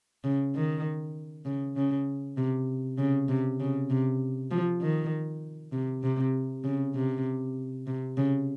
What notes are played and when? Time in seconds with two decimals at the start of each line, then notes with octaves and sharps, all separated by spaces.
0.24 C#3
0.55 D#3
1.45 C#3
1.76 C#3
2.37 C3
2.98 C#3
3.28 C3
3.60 C#3
3.90 C3
4.51 F3
4.81 D#3
5.72 C3
6.03 C3
6.64 C#3
6.95 C3
7.87 C3
8.17 C#3